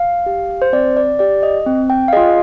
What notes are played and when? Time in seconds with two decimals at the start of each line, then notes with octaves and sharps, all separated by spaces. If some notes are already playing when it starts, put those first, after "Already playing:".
Already playing: F5
0.26 G4
0.62 C5
0.73 C4 D5
0.97 D5
1.19 G4 D5
1.43 D#5
1.67 C4
1.90 G5
2.08 F5
2.13 F4 G#4 D#5